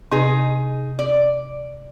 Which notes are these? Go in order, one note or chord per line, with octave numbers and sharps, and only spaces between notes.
C3 D#4 G#4
D5